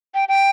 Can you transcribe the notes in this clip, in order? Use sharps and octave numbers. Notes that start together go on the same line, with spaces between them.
G5
G5